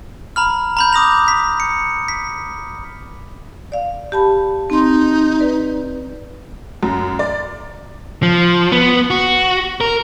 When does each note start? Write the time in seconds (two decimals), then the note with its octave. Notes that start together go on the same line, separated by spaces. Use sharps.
0.36 A#5 B5 F6
0.77 A#5 B5 G6
0.93 D6 D#6 A#6 F7
1.28 B6
1.60 C#7
2.08 B6
3.72 D5 F5
4.12 G4 A5 B5
4.70 C4 D#4 C6
5.40 B4 D5
6.83 F#2
7.19 D5
8.23 F3
8.72 B3
9.10 F#4
9.81 A#4